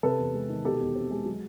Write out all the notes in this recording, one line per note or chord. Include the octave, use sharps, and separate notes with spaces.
C3 A4 B4
E2
G#3
D#3
B2 G4 A4
E2
C4
G#3
F#3